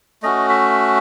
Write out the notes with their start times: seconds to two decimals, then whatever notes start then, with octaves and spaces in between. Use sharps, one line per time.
0.23 A3 C#4 F#4 D#5
0.49 E5